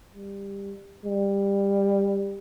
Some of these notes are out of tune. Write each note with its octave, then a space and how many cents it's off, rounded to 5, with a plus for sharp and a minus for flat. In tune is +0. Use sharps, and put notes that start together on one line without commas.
G3 +20
G3 +20